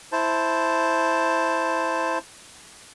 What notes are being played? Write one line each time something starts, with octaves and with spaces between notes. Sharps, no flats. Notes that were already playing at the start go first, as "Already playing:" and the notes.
E4 C5 A5